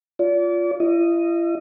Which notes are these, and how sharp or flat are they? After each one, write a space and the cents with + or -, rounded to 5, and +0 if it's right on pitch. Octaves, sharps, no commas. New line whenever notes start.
F4 +0 D5 -35
E4 +45 D#5 +0